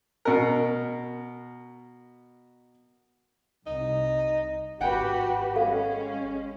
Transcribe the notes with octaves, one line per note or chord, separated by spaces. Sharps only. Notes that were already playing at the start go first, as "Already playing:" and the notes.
B2 A#4
C2 D#4
G#1 F#4 G4 B4 F#5 G5
G#3 C#4 A4 F5